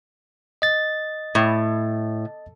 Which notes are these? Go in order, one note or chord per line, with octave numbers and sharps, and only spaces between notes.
D#5 A6
A2